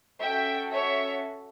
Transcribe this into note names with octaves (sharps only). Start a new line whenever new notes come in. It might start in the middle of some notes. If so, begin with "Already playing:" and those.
C#4 F#4 A4 E5 G5
C#5 E5